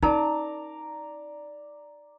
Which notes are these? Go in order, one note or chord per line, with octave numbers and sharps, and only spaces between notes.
C#4 D#4 A#4 D5 A5 A#5